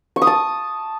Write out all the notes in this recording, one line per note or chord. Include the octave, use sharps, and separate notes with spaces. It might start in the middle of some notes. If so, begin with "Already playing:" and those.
C#6
D#6
A5